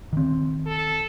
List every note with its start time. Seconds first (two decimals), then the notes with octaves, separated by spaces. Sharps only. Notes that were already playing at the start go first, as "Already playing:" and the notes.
0.13 D#3 C4
0.66 A4